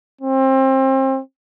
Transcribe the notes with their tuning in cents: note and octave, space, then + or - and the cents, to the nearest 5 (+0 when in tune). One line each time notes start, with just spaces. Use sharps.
C4 +30